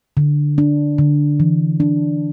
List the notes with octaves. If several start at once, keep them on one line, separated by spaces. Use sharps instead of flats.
D3
D4
D3
E3
D4